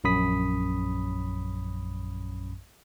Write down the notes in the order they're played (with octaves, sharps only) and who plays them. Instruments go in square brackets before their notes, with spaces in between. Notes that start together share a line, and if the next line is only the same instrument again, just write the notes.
[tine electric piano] A#1 F#2 C#4 B5 D#6 B6